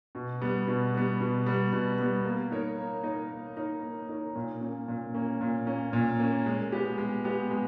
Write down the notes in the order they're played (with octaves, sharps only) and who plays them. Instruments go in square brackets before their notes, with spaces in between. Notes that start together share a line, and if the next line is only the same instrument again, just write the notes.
[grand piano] B2
G3 B3
B2
G3 B3
B2
G3 B3
B2
G3 B3
A#3
D#4 A#4 C#5
A#3
D#4 A#4 C#5
A#3
D#4 A#4 C#5
A#3
D#4 A#4 C#5
A#2
A#3 C#4
A#2
A#3 C#4
A#2
A#3 C#4
A#2
A#3 C#4
G#3
B3 G4
G#3
B3 G4
G#3